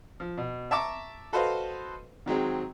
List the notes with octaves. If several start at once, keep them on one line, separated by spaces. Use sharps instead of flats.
F3
B2
E5 A5 A#5 C#6 D6
F#4 A4 B4 C5 D#5 F5
D#3 F#3 G#3 C4